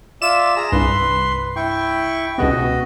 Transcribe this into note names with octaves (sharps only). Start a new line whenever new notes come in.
F4 D5 E5 E7
G#4 A#5
C2 G2 B4 C6
E4 G5 C#6
C#2 B2 B3 F#4 D#5